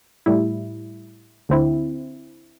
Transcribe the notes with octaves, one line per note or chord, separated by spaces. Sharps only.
A2 G3 E4
D2 D3 C4 E4